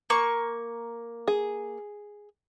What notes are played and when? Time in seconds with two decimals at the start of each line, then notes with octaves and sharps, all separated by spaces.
0.10 A#3 C#6
1.28 G#4